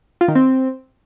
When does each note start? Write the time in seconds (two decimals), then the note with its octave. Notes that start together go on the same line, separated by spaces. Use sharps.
0.21 F4
0.28 D#3
0.35 C4